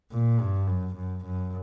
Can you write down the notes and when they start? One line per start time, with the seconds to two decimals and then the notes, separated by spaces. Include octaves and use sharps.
0.11 A#2
0.40 G2
0.67 F#2
0.95 F#2
1.24 F#2